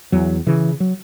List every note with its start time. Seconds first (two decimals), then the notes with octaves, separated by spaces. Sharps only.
0.12 E2 F#3
0.47 C#3 E3
0.80 F#3